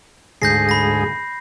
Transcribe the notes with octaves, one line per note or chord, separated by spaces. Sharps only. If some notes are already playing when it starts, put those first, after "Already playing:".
D2 G#2 G#4 G6 A#6 C7
B5 A#6